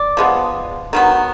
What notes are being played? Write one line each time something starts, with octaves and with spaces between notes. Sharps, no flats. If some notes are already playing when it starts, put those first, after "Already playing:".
Already playing: D5
F3 G#3 B3
D#3 F#3 B3